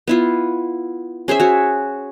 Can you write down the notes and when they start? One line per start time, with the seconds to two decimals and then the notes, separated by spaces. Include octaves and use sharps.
0.08 B3 E4 F4
1.28 C#4 G#4 C5 E5
1.40 F#4 C#5